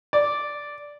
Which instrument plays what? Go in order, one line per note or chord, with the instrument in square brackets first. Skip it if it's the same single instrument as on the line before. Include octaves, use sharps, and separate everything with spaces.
[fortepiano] D5